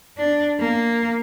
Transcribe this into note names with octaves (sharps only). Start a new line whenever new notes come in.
D4
A#3